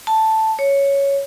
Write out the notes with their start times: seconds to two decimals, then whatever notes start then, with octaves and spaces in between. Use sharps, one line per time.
0.07 A5
0.59 C#5